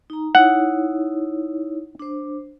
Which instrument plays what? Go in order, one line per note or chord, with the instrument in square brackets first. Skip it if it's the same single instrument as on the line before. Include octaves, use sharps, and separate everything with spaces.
[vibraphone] D#4 A#5
[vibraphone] D#4 E4 C#5 [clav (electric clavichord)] F#5
[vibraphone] D4 C5